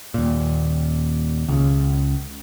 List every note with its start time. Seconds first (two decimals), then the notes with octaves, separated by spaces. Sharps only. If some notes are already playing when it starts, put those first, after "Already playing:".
0.14 D#2 A#2
1.48 C#2 C#3